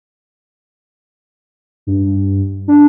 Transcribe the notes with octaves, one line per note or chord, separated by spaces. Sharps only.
G2
D4